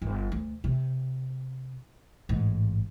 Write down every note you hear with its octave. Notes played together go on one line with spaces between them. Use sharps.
G1
D2
C3
A1 G#2